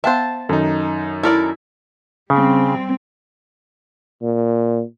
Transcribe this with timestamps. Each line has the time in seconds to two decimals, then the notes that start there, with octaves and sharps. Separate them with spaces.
0.04 B3 C5 E5 F5 G5 A5
0.49 F#2 D#3 D#4
1.23 E4 A4 A#4 D5
2.30 C#3 G3 C4
4.22 A#2